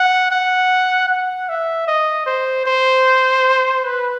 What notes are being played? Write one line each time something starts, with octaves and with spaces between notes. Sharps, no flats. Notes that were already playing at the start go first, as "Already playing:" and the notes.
Already playing: F#5
F#5
F#5
E5
D#5
C5
C5
B4